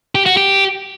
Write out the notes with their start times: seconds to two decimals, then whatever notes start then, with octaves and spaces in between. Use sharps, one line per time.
0.15 G4
0.26 F#4
0.37 G4